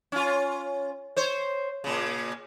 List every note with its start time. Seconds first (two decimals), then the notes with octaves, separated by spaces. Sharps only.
0.12 C#4 F4
1.17 C5 C#5
1.84 A#2 C#3